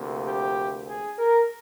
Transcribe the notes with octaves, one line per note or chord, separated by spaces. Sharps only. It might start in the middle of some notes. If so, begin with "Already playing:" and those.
Already playing: D2 C3 F3 A#3
G4
G#4
A#4